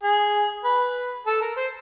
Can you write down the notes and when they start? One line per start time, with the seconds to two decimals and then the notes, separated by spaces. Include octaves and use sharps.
0.04 G#4
0.65 B4
1.27 A4
1.42 A#4
1.57 C5